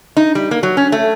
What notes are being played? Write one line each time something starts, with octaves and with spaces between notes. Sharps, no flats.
D#4
G3
A#3
F#3
C#4
A3